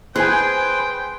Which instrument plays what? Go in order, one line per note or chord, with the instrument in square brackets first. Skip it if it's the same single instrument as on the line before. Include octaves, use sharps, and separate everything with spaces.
[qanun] G#4 [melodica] B4 C5 C6 [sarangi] G5 [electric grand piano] G#5 F#6